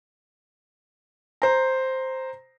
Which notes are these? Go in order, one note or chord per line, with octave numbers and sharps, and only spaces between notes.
C5 A#5